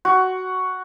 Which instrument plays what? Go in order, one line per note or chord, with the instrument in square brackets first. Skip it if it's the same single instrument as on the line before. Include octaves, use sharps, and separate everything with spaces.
[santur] F#4